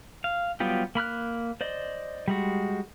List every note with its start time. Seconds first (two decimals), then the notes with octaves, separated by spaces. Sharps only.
0.24 F5
0.60 F#3 G3 B3 F4 G4
0.95 A#3 B5 F6 F#6
1.61 C5 D5 D#5
2.28 G3 G#3 F#4